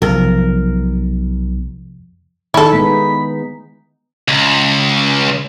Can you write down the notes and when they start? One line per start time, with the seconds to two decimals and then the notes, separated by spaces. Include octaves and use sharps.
0.02 B1 F2 C3 F3 A#4
2.54 D#3 D#4 E4 A4
2.73 G#3 B3 D#4 B5
4.28 C#2